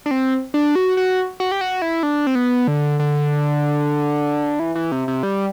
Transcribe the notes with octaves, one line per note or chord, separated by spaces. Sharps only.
D4
C4
D4
F#4
F#4
F#4
G4
F#4
E4
D4
C4
B3
D3
D3
E3
E3
C3
C3
G3